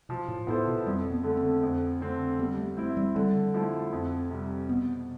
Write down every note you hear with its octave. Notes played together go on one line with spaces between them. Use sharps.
B2 F3
A2
A2 B3 E4 A4 C5
B2
F2 G3
B3
D3 A3
C4
F2
D3 A3 C4
G3 B3
A3
A3 C4 E4
G3
D3 G3
F3 A3 E4
F2
C3 G3
B2 B3